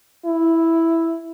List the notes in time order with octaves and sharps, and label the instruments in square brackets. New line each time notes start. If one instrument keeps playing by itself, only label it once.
[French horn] E4